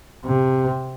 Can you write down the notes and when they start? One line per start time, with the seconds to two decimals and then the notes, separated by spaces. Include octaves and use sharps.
0.25 C3